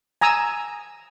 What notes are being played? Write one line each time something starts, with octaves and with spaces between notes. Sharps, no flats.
G#5 A#5 D#6 E6